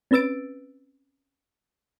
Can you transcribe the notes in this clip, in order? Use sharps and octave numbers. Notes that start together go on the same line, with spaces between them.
C4 C#4 B4 E6 A6 D7